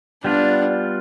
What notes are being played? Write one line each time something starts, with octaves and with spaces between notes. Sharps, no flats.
G3 B3 D4 F4